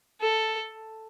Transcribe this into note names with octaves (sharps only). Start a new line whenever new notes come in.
A4